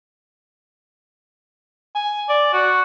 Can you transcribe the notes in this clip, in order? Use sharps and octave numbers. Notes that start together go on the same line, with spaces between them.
G#5
D5
F#4